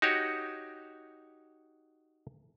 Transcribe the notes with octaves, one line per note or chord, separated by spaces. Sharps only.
D#4 F#4 G4 C#5